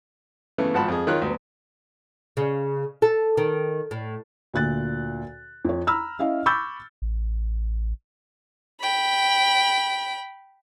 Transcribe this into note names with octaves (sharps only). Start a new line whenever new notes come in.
C#3 E3 A3 B3
G#1 F3 F#5 A5 B5
F2 G#4
D#3 F4 C#5 F#6
D2 F#3 B3
C#3
A4
D#3
A2
D2 A#2 F#6 A6
F2 C#5
A#5 B5 E6 F6
C#4 E4 D#5 F5
B5 C#6 D6 E6 G6 A6
A1
G5 B5